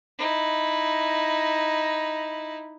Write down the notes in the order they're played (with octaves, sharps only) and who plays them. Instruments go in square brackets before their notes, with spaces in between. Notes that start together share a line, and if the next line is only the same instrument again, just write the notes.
[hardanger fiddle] D#4 E4